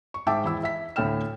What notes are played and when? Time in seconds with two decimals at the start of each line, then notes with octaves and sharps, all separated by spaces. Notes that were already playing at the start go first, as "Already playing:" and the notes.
0.14 C#6
0.27 G#2 E5 G5 A5 D6 E6
0.44 E2 E4 E6
0.63 E5 B6
0.96 D2 A2 A4 G5 F6 E7